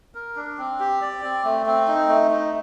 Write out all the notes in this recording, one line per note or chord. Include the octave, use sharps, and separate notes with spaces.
A#4
D4
C4
G4
D5
C4
A3
C4
D#4
A3
D#4